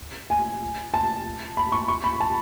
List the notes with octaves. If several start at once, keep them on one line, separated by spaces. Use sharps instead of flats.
G#5
A5
B5
C#6
C#6
B5
A5